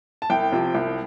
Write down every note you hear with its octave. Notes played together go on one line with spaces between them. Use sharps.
A5
C2 G5
C3 F3
C2